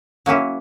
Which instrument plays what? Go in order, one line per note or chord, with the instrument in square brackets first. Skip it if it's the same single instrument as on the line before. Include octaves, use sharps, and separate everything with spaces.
[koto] F#3 A#3 C#4 E4